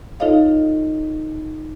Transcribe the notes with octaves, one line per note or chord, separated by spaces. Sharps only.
D#4 F4 A4 C#5 D#5 F5